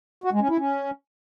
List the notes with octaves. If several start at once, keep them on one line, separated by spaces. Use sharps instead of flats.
F#4
G#3
C#4
E4
C#4